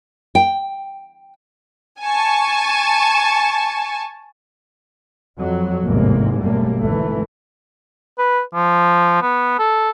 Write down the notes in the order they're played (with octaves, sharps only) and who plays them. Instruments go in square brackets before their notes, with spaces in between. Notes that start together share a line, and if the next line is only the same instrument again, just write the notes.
[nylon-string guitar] G5
[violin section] G#5 A5 C#6
[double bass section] F2 F#3
A1 E2 G#2 C3 A#3
G#1 F#2 B2 G3 A3 A#3
G#1 D2 E3 A3
[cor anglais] B4
F3
B3
A4